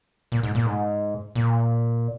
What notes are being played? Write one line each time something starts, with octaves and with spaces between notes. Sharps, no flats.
A#2
G#2
A#2
G#2
A#2